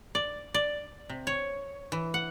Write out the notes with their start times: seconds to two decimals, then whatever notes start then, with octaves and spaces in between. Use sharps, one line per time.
0.15 D5
0.54 D5
1.09 C3
1.27 C#5
1.92 E3
2.14 F#5